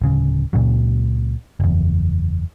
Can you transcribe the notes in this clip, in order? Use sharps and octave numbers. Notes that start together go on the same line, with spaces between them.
D1 C#3
C#2 A#2 C#3 F#3
F#1 E2